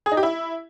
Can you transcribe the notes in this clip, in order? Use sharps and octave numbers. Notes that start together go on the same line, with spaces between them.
G#4
D#4
G4
E4